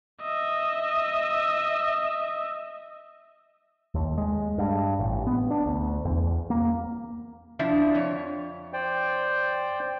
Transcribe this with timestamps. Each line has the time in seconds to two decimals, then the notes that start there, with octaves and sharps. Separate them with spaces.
0.22 D#5 E5
3.94 D#2
4.18 G#3
4.58 G2
4.99 A1
5.27 B3
5.51 D4
5.66 D2
6.05 E2
6.50 A#3
7.59 F3 D4 E4
7.95 F2 C#5
8.73 C5 D5 G5